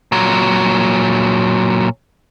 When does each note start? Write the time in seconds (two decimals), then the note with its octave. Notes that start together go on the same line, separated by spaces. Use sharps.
0.12 A#2 F#3